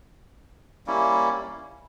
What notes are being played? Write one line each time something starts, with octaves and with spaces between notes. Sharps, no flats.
G3 A#3 C#4 E4